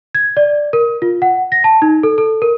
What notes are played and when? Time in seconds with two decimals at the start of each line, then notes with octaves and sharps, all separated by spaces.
0.15 G#6
0.37 D5
0.73 A#4
1.02 F4
1.22 F#5
1.52 A#6
1.64 A5
1.82 D#4
2.03 A4
2.18 A4
2.42 A#4